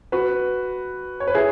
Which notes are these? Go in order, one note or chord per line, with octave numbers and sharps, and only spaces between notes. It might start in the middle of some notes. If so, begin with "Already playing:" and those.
F#4 B4
C#5
B4
E4 G#4